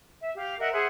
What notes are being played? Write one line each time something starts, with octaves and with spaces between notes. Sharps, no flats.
E5
G4 F5
A#4 D#5 E5 F#5
G#4 C5 E5 F#5